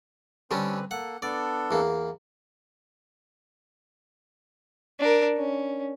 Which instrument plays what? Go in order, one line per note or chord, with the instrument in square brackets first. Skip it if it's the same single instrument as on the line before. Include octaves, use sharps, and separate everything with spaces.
[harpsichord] D3 G3 C#4 [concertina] C4 B4
[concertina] A#3 A4 [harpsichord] F#5
[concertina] B3 D4 A4 [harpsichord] D5
[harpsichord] E2 A#3
[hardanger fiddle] D4 A#4
C#4